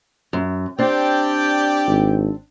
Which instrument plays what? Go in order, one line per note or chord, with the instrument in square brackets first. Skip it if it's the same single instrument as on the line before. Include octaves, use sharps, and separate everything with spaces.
[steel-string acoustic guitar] F#2
[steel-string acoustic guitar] C4 D4 [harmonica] G4 D5 G5
[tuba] G#1